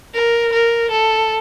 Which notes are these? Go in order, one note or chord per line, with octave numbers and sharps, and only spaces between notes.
A#4
A#4
A4